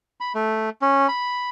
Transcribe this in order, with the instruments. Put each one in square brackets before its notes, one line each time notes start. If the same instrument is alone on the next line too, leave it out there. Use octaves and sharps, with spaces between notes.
[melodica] B5
A3
C#4
B5